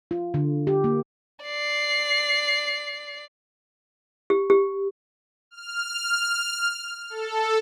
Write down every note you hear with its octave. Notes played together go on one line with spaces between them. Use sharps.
F4
D3
G4
A#3
D5 C7
G4
G4
F6
A4